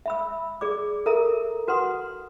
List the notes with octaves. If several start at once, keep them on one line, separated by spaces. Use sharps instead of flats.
E5 B5 E6
G#4 D5 D6
A4 A#4 E5 A#5 E6
F#4 B4 F#5 C6 D#6